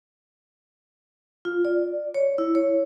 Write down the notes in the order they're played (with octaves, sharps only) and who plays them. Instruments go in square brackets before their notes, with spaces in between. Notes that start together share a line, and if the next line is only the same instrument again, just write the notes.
[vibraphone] F4
D5
C#5
E4
C#5